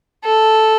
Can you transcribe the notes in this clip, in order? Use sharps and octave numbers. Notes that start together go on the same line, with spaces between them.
A4